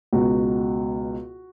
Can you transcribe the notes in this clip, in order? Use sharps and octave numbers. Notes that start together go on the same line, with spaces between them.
C#2 B2 F#4